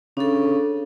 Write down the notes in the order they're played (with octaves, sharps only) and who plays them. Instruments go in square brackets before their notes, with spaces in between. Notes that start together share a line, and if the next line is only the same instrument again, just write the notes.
[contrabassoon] C#3 [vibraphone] D4 A4